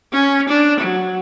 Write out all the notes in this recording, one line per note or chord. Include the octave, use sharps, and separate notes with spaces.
C#4
D4
F#3